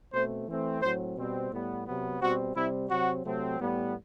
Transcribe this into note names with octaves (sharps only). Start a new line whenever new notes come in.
B2 A3 C4 C5
E3 A3 C4
A2 F#3 C4 C5
B2 G3 C4
A2 G3 B3
C3 F#3 B3
B2 G3 C4 F#4
C3 G3 C4 E4
C3 F#3 C4 F#4
C3 F#3 A3 C4
A2 G3 B3